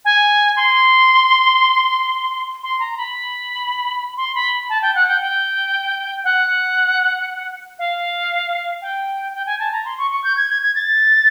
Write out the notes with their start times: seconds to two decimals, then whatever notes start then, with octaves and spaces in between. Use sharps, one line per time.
0.05 G#5
0.56 C6
2.63 C6
2.80 A#5
2.97 B5
4.17 C6
4.35 B5
4.69 A5
4.82 G5
4.95 F#5
5.08 G5
5.21 G5
6.24 F#5
7.79 F5
8.82 G5
9.34 G5
9.46 G#5
9.59 A5
9.72 A#5
9.85 C6
9.98 C#6
10.11 C#6
10.24 G6
10.37 G#6
10.50 G#6
10.62 G#6
10.75 A6